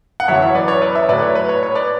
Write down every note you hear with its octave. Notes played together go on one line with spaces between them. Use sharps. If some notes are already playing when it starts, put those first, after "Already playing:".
F#5
F#2 E3 C#5 E5
C#5
B4 D5
C#5
B4 D5
C#5 E5
A2 F#3 B4 D5
C#5
B4
C#5
C#5
B4 D5